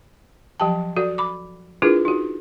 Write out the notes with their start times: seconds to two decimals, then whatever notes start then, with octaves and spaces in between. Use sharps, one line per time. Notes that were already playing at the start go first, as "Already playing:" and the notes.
0.60 F3 F#3 G4 G5 A5
0.96 F#4 A4 D5
1.18 B5 D6
1.82 D4 E4 F4 G#4 A#4 B4
2.05 D#4 F#4